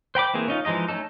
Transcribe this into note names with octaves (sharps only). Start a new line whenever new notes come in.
C5 G5 B5 D6
E3 A#3 C4 G#4
C#4 D#4 F4
E3 F3 G#3 D#4 D#5
A3 C#4 D#4 A4